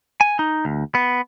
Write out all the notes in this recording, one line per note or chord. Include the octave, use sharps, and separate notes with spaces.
G#5
D#4
D2
B3